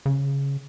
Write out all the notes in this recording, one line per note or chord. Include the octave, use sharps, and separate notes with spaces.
C#3